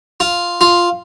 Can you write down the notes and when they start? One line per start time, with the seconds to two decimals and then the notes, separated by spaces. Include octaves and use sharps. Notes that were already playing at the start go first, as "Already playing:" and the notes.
0.20 F4
0.61 F4